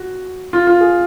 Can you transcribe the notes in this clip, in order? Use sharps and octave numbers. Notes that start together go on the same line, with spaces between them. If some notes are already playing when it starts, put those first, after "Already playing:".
Already playing: F#4
F4
F4
G#4